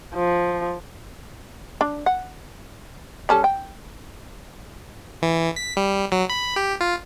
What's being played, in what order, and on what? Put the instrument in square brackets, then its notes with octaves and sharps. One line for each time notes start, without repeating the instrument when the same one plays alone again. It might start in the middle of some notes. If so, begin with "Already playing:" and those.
[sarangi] F3
[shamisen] D4
F#5
G3 C#4 A4
G5
[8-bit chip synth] E3
B6
G3
F#3
B5
G4
F4